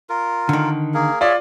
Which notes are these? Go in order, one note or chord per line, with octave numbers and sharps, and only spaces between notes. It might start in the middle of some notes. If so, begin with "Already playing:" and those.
F4 A#4
D3 D#3
A#3 G#4 A#4
F4 G#4 C#5 D5 E5